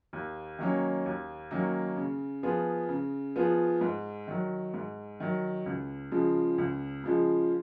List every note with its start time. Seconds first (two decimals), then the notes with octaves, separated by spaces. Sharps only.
0.13 D#2
0.59 D#3 F#3 A#3 C#4
1.06 D#2
1.51 D#3 F#3 A#3 C#4
1.97 C#3
2.43 F3 B3 F4 G#4
2.89 C#3
3.36 F3 B3 F4 G#4
3.81 G#2
4.28 D#3 F#3
4.74 G#2
5.20 D#3 F#3
5.66 C#2
6.12 C#3 F3 G#3
6.58 C#2
7.04 C#3 F3 G#3